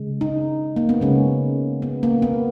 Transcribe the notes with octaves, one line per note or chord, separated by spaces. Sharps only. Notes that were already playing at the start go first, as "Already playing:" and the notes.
Already playing: C#3 G#3
D#4
A#3
B3
C#3 G#3 C#4
B3
A#3
B3